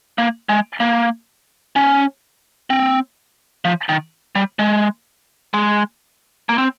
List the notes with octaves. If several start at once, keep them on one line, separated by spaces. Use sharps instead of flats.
A#3
G#3
A#3
C#4
C4
F3
D#3
G3
G#3
G#3
A#3
C4